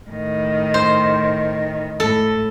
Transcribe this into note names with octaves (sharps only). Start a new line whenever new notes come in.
A2 D#3
C5
A2 A4